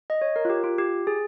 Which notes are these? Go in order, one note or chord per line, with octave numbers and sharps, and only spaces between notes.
D#5
C#5
A#4
F4
G4
F4
G4
G#4